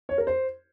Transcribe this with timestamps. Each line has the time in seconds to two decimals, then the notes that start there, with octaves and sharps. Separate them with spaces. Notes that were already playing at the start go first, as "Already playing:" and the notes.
0.09 C#5
0.18 A#4
0.27 C5